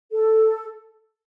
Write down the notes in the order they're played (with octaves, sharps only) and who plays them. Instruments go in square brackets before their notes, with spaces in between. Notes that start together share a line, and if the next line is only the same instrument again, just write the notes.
[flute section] A4